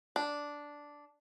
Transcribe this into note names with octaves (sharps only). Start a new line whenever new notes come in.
D4